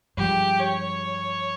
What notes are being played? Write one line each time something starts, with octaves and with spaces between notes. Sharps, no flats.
G2 F3 G#3 G4
C#5